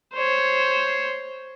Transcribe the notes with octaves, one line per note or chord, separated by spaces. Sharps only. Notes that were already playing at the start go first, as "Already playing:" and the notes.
C5 C#5